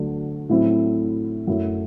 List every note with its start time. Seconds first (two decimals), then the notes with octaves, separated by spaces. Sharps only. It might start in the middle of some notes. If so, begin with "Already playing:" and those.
Already playing: D2 D3 F#3 A3 D4
0.49 A2 F#3 C4 E4
1.47 F#2 F#3 A3 E4